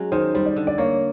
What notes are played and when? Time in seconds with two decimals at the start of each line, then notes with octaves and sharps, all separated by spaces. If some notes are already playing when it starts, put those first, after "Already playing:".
Already playing: F#3 G#3 C#4
0.12 D#3 C5
0.34 G3 C5
0.45 D5
0.56 D3
0.67 D5
0.78 A#3 C#5